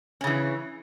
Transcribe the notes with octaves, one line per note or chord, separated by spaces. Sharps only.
C#3 E3 C#4